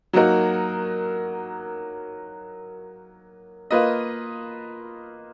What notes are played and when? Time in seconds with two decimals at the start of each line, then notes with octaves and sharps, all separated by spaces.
0.13 F#3 A#3 D#4 F#4 A#4
3.71 A#3 F4 B4 D#5